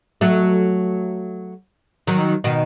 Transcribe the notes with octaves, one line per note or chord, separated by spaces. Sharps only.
F#3 A3
D#3 F#3
B2 D#3